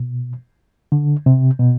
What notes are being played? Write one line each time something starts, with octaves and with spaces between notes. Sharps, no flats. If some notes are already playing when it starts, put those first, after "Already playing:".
Already playing: B2
D3
C3
B2